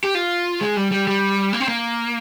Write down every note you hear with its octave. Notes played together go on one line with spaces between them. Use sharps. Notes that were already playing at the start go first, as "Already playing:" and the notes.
G4
F4
G#3
G3
G3
G3
A#3
C4
A#3